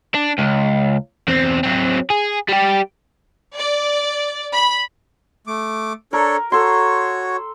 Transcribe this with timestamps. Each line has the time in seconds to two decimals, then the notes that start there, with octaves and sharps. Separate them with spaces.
0.15 D4
0.39 C#2
1.28 E2 C4
1.63 F#3 C4
2.10 G#4
2.49 G3 G4
3.57 D5
4.53 B5
5.47 A3 D6
6.13 D4 A4 A#4 C#5
6.52 F#4 A4 C#5 C6